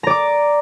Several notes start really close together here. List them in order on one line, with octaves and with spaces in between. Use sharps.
A#5 D5 D6